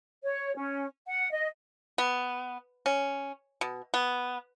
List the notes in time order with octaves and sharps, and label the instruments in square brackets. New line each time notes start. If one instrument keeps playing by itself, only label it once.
[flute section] C#5
C#4
F#5
D#5
[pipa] B3
C#4
B2
B3